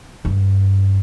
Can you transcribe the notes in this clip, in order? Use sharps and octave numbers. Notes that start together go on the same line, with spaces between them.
G2